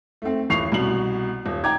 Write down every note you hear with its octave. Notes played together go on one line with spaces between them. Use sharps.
A3 C4
D#1 E3 C#6 C7 F7
C2 B2 F#7
D#1
G5 A#5 D6 G#6